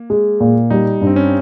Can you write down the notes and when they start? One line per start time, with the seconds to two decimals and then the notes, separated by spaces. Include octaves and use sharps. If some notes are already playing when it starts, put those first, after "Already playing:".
Already playing: A#3
0.10 G#3
0.40 A#2
0.70 G3 D#4
1.01 G2
1.07 C4
1.16 C#4